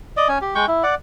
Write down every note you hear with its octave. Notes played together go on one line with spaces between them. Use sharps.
D5 D#5
C#4 G#5
G4
G#3 G5 C#6
E4
D5 F#5